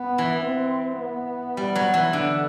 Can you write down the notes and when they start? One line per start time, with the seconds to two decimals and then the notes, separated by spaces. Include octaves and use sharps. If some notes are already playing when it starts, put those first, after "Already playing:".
Already playing: B3
0.18 E3
0.45 C4
1.01 B3
1.57 G3
1.75 F#3
1.94 E3
2.13 D3